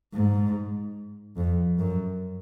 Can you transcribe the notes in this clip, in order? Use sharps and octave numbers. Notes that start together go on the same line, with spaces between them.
G#2
F2
F#2